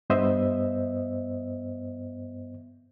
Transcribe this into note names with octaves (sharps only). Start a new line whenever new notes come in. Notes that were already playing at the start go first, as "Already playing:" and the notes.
G2 B3 C5 D#5 E5